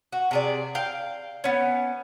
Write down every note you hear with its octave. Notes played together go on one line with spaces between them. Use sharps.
F#4
C3 G#4 D5
F5 G5
B3 C#4